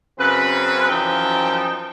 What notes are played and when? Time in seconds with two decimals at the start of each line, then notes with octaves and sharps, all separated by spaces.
0.19 F#2 C#3 C4 B4
0.89 F#2 E3 F3 D#4 G5 A5